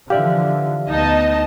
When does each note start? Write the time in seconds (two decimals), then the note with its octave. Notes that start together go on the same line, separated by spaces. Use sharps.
0.10 D3 E3 F3 G4 D5 E5 F5
0.90 D2 B3 D#4 D#5 A5